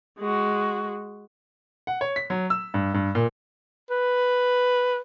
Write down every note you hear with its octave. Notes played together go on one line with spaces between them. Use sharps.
G#3 F#4
F#5
C#5
B6
F#3
E6
G2
G2
A#2
B4